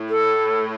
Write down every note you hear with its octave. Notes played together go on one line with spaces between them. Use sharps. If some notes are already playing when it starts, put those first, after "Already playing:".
Already playing: A2
A4